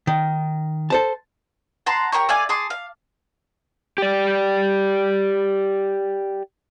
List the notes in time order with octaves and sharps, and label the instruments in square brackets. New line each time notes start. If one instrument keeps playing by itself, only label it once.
[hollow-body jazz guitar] D#3
A4 C5 A5
[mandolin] F#5 A5 A#5 C6
G4 A#4 C#5 C#6
A3 D5 F5 G#5
G#4 A5 C6 D6
F5
[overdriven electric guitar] G4 D5